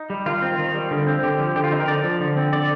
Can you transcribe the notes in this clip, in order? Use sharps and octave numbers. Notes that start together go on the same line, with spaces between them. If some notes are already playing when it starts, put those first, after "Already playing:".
Already playing: D#4
G3
D#3 F4
C4
D#3
G3
D3
C4
D3 G4
F3
D3 G4
F4
C4 D#4
A#4
D3 D5
F3
D3
C4
D3 D5